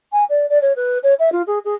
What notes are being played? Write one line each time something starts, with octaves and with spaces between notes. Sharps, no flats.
G#5
D5
D5
C#5
B4
C#5
E5
F4
G#4
G#4